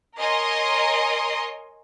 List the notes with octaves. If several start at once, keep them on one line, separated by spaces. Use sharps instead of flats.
A#4 C#5 D#5 G#5 C6